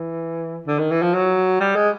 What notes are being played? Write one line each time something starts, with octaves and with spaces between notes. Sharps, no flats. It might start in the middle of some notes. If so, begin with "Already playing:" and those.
Already playing: E3
D3
D#3
E3
F3
F#3
G3
G#3